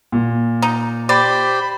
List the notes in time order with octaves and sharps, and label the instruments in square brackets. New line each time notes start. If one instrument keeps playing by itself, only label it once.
[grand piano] A#2
[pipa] D#4
[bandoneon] G4 C5 C6 [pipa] D5 [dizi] B5